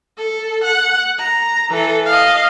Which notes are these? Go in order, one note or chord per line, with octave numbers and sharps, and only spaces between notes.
A4
F#5
A#5
E3 A4
D#5 F5